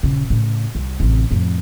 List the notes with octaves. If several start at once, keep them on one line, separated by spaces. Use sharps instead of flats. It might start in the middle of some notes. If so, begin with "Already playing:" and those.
D#1 C#3
A2 C#3
C2
A1 C3
F2 A2